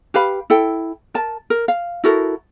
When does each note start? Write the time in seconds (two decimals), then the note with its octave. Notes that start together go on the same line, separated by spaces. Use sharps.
0.14 G4 B4 F5 B5
0.50 E4 A4 G5
1.14 A#4 A5
1.50 A#4
1.68 F5
2.04 E4 F#4 A4 A#4